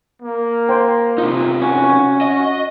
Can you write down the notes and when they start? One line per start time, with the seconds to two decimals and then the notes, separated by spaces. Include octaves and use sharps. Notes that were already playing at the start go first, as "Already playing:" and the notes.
0.22 A#3
0.69 C5 G5
1.18 C3 D#4 F4
1.62 C#4 F#4
2.21 F#4 D#5